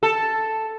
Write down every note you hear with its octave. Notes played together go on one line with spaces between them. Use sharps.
A4